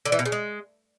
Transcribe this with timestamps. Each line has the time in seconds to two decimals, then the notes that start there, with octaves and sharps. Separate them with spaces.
0.05 D3
0.12 E3
0.19 B2
0.25 C#3
0.32 G#3